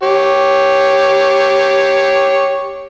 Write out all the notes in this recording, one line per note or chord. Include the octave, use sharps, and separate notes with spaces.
G4 C#5